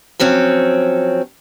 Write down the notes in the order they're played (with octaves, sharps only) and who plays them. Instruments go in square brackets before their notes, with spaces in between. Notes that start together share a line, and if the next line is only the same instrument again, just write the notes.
[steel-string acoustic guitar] F3 F#3 C4 C#4